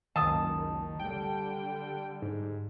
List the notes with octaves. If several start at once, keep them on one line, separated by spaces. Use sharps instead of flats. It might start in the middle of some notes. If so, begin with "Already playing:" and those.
F#1 C#2 F#2 D#3 A5 D#6
D3 G3 G5
G#2